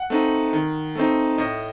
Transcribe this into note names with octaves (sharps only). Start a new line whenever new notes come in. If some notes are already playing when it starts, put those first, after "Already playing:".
Already playing: F#5
A3 C4 D#4
D#3
A3 C4 D#4
A2 D#5